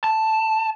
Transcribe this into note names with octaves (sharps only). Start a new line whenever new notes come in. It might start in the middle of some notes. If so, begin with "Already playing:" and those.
A5